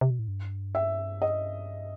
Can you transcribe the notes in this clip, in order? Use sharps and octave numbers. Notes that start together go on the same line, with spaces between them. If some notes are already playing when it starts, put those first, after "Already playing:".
C3
B2
A2
G2
E5
D#5